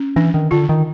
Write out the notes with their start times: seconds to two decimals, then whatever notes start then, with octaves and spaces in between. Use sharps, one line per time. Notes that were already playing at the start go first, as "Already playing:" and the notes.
Already playing: C#4
0.16 E3 D4
0.34 D#3
0.51 D3 F4
0.69 D#3